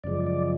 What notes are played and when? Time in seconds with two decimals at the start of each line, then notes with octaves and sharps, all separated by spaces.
0.04 F#2 C#3 F3 G#3 D5
0.26 D5